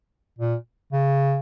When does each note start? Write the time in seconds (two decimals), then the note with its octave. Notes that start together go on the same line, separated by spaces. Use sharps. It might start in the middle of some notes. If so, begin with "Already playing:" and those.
0.39 A#2
0.93 C#3